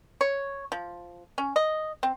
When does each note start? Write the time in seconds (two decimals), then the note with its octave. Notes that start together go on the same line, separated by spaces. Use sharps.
0.21 C#5
0.72 F3
1.38 C#4
1.56 D#5
2.03 C4